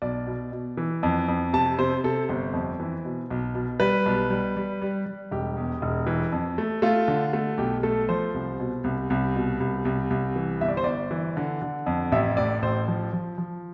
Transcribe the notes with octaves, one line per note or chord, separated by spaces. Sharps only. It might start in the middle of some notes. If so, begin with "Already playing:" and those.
B1 D5
B2
B2
E3
F2
F2
C3 A5
C3 C5
C3 A4
G1 C5
F2
E3
B2
B1
B2
G3 B4
B1
G3
G3
G3
G3
E1 G4
E2
E1
E3
F2
A3
A3 F4
D3
A3
B1 G4
A3 A4
F3 C5
C2
B2
C2
C2
B2
C2
C2
C2
E3
G1 E5
D5
C5
G1 D5
E3
D3
D3
F2
A1 E5
A2 D5
A1 C5
F3
F3
F3